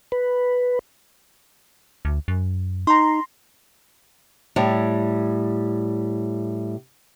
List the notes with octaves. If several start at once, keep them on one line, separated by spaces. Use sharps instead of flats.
B4
D2
F#2
D#4 A#5 C6
A2 G3